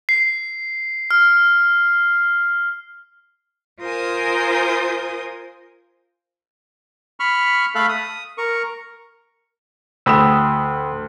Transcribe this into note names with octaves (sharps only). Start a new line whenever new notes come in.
C7
F6
F4 A#4 C5 G#5 D#6
B5 C#6 F6
A3 A4 E5 F5 B5 F#6
D#6
A#4 C#6
D2 G5 B5 D#6 E6 E7